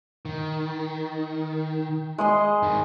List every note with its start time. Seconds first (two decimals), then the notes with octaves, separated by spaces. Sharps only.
0.25 D#3
2.18 G#3 D#5 C6
2.63 G#2 D#3